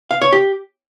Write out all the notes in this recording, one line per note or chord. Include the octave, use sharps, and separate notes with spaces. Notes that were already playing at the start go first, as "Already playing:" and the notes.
F5
C#5
G4